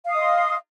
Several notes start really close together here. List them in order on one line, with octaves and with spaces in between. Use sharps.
F5 D#6 D#5 C6